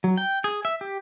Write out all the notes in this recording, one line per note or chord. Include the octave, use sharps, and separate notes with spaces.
F#3
G5
G#4
E5
G4